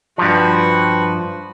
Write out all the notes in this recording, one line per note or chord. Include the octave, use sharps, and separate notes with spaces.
G2 F3 F#4 B4